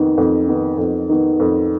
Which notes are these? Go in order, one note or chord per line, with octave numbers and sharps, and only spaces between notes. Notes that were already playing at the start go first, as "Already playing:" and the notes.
Already playing: F2 D#3 B3
F2
D#3 B3
F2
D#3 B3
F2